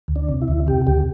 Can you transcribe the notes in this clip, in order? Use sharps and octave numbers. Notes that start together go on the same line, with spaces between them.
D2
D4
C3
E4
D2
C3 G4
D2 G4